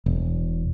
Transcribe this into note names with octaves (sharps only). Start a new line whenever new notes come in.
E1